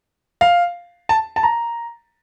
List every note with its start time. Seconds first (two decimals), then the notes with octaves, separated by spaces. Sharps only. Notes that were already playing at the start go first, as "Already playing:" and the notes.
0.41 F5
1.09 A5
1.36 A5
1.43 A#5